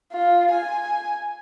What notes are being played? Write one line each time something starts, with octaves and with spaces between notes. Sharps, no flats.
F4
G#5